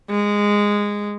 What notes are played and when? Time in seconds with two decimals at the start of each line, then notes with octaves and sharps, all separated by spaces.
0.10 G#3